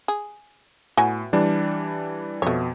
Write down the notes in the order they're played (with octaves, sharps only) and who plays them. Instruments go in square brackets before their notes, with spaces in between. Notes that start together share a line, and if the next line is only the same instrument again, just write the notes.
[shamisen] G#4
[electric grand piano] A2 [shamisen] F#3 B3 G#5
[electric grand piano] E3 G3 D4
[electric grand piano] F2 B2 [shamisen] A3 C#5